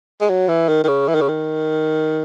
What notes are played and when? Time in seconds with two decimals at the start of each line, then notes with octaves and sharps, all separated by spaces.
0.21 G#3
0.29 F#3
0.49 E3
0.68 D#3
0.84 D#3
0.88 C#3
1.08 E3
1.15 D#3
1.21 C#3
1.28 D#3